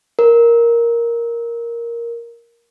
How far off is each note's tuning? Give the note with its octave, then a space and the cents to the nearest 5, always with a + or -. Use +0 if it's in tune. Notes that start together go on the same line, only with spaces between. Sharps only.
A#4 +5